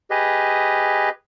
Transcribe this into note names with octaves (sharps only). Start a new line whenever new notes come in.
G4 G#4 B4 D#5